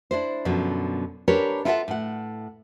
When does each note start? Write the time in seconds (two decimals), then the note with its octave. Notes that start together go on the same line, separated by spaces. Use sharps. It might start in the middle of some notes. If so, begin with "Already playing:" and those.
0.11 D4 E4 C5
0.45 F#2 B2 D3 F3
1.28 D4 G4 A#4 B4 C#5
1.65 E4 F4 A4 B4 E5 F#5
1.88 A2 F#5